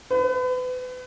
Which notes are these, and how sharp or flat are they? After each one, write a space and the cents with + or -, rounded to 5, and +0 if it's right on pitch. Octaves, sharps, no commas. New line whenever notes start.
B4 +35